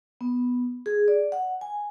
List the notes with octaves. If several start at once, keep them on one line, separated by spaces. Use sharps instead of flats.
B3
G#4
D5
F#5
G#5